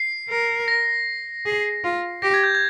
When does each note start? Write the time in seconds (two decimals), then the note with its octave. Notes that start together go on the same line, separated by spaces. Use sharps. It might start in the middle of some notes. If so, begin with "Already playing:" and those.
Already playing: C7
0.29 A#4
0.68 A#6
1.46 G#4
1.84 F4
2.22 G4 A#6
2.34 G#6
2.43 G6
2.55 G#6